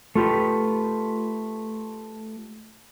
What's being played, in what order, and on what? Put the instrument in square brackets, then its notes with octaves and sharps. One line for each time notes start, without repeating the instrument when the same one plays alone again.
[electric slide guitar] A3 F4 G4 B4